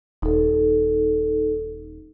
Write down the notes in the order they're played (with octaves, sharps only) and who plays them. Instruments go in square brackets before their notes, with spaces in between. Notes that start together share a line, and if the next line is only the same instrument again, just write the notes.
[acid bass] D#1 [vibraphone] D#4 A4